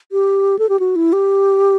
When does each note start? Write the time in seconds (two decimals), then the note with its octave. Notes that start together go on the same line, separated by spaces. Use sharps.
0.12 G4
0.59 A4
0.69 G4
0.79 F#4
0.96 E4
1.13 G4